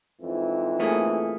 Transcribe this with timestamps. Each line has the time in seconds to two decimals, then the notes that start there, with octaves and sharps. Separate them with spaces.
0.22 F2 G#2 E3
0.80 A3 A#3 G#4